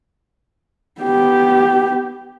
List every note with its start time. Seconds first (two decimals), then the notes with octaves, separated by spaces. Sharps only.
1.02 B3 G4